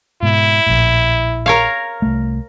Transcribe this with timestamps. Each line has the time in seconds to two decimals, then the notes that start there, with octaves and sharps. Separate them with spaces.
0.23 G#2 B2 E4
0.67 A#1 A2
1.46 A#4 C#5 F5
2.02 C2 A3